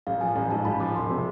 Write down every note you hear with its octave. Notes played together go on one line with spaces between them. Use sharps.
A1 F5
F3 G#5
A1 G#5
G#2 A5
A1 B5
F3 D6
E1 C6
C3